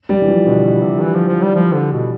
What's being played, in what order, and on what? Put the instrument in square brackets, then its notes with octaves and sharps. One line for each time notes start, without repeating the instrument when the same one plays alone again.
[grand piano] G3
E3
F3
[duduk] B2 [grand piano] D3
[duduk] B2
C3
E3
F3
F3
G3
F3
D3
B2